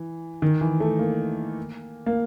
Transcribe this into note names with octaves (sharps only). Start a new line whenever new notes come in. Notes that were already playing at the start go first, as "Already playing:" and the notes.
Already playing: E3
D#3
E3
A3
A#3
A#3